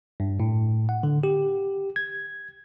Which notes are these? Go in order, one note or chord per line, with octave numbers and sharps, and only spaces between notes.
G2
A2
F#5
D3
G4
G#6